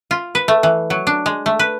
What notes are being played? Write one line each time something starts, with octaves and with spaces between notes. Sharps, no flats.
F4
B4
A3
E3
F#3
D4
G#3
A3
B4